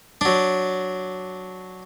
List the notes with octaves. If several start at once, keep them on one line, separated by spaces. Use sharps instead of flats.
F#3 D4